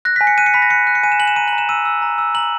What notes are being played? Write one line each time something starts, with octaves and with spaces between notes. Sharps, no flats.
F#6 A#6
B6
G#5
C#7
F#6 D#7
C#7
B5 B6
A#6
F#6 C#7
F#6 D#7
C#7
G#5 D#7
E7
G#5 F#7
E7
A#5 D#7
F#7
A#5
E7
E6 D#7
E6
A#5
E6
A#5 F#7